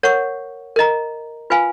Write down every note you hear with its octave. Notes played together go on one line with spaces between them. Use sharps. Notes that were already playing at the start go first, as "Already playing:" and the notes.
A#4 C#5 F#5 C#6
A#4 D#5 A#5
F4 B4 F5 G#5 B5